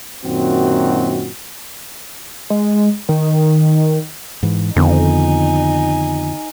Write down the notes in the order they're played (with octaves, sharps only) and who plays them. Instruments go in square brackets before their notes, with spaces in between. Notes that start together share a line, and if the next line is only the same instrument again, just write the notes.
[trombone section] F#2 A#2 D#3 C4 F#4
[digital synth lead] G#3
D#3
[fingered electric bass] G#2 E3
[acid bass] F2 [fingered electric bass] D3 D#3 B3 [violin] D#4 G#5